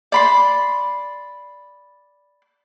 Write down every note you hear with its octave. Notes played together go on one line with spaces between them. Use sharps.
D5 B5 C6